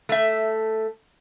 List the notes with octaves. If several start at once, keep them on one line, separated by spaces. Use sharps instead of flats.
A3 E5